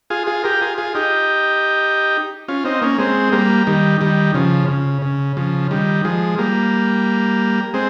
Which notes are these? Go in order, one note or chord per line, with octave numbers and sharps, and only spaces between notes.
F4 G#4
F4 G#4
G4 A#4
F4 G#4
F4 G#4
D#4 G4
C#4 F4
C4 D#4
A#3 C#4
G#3 C4
G3 A#3
D#3 G3
D#3 G3
C#3 F3
C#3
C#3
C#3 F3
D#3 G3
F3 G#3
G3 A#3
G#3 C4